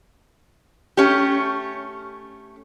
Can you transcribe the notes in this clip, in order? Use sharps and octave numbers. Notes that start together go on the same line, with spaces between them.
A3 C#4 G4